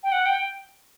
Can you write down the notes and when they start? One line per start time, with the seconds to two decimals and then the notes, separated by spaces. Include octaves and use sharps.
0.03 G5
0.12 F#5
0.26 G5